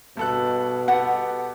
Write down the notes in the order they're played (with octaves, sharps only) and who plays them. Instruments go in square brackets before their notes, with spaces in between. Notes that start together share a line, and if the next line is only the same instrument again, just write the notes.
[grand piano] G2 A4 F#6 [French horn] B2
[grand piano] B3 G4 A4 [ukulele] F#5